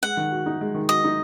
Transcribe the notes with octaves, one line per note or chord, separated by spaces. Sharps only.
G#3 F#5
D#3
F#4
D#4
G#3
D#3
F#4 D#5
D#4